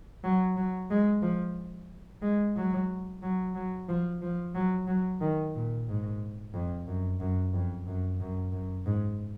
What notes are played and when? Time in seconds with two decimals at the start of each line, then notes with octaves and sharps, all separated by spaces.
0.24 F#3
0.57 F#3
0.90 G#3
1.23 F3
2.22 G#3
2.56 F#3
3.23 F#3
3.55 F#3
3.89 F3
4.22 F3
4.55 F#3
4.87 F#3
5.21 D#3
5.55 A#2
5.88 G#2
6.54 F2
6.87 F#2
7.20 F#2
7.53 F2
7.87 F#2
8.20 F#2
8.52 F#2
8.86 G#2